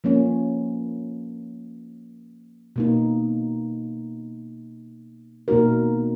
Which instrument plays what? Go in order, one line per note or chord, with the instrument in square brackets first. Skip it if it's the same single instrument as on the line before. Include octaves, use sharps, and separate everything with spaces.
[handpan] F3 A#3 C#4
B2 A#3 D#4
B2 A#3 D#4 F#4 A#4